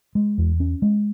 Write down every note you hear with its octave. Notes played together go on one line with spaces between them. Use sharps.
G#3
E2
C#4
G#3